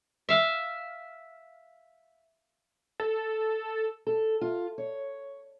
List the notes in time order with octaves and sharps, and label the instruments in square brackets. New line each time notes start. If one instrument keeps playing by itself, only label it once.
[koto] E5 F5
[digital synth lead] A4
[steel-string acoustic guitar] A4
F4
C#5